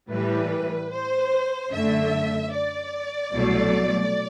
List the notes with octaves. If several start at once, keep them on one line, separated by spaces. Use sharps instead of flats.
A2 E3 G3 B4
C5
F#2 D3 A3 E5
D5
C2 B2 F#3 A3